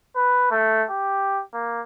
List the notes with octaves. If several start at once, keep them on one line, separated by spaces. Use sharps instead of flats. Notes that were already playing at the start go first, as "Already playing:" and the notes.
B4
A3
G4
A#3